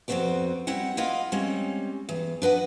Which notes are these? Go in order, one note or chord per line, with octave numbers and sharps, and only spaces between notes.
F2 B3 C4 F#4 C5 D5
G3 C4 E4 F#5
E4 F4 D#5 F5 F#5
G3 G#3 C4 C#4
E2
D4 B4 D#5 F#5